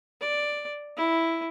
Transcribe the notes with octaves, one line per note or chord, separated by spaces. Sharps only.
D5
E4